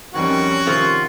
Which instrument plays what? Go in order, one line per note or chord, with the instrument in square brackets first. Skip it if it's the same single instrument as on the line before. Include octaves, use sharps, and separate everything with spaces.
[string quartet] F2 G3 C#4 [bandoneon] D#3 [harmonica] F#4
[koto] C3 D#3 C4 [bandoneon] F4